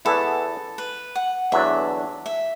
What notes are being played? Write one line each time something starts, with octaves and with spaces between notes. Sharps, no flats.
E2 E3 B3 E4 A4
B4
F#5
E2 D3 F#3 D4 E5
E5